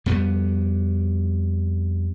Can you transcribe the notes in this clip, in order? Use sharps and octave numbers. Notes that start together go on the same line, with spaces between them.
F2 G3 B3